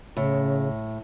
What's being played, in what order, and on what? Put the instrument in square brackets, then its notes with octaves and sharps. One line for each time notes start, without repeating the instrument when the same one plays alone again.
[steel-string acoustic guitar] A2 [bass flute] C#3